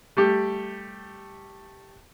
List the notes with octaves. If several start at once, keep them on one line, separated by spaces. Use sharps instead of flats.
G3 A3 G4